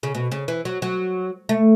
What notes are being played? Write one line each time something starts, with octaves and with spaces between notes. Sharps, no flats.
C#3
B2
C#3
E3
F#3
F#3
A3